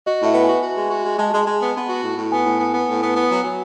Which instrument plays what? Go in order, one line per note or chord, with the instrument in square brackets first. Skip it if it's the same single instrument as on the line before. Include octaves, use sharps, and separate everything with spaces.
[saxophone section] F#4 [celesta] D#5
[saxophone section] A2 [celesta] E5
[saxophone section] B3
[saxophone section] F#4 [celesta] G#5
[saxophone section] F#4
G#3
F#4
G#3
[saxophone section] G#3 [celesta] A5
[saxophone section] G#3
G#3
B3
B3
F#4
A2
A2
[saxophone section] B3 [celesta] G#5
[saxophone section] A2
B3
B3
A2
B3
B3
F#3
[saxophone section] F#3 [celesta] G#5